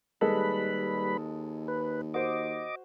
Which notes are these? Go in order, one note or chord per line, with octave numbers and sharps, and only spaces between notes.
D#2 G3 G#3 A4 B4 B5
B4
F#4 C5 D#5 D6